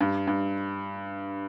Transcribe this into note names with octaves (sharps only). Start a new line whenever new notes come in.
G2
G2